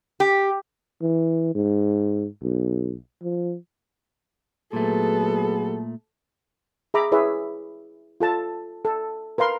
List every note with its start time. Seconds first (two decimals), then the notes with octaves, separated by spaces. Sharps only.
0.20 G4
1.02 E3
1.55 G#2
2.42 B1
3.23 F3
4.73 A#2 F#3 A3 B3 G#4 A4
6.94 G#4 E5 A#5 B5 D6
7.12 E4 G#4 B4 C#5 E5
8.20 F4 A4 A5
8.85 A4
9.38 A#4 B4 F5 C6